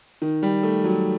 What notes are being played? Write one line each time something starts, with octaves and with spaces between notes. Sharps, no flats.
D#3
G3
A3
F#3